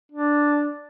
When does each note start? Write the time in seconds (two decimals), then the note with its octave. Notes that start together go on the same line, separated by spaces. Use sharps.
0.12 D4